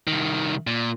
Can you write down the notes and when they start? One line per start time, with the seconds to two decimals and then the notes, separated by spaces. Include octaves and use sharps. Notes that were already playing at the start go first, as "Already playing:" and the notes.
0.07 C2 D#3
0.67 A#2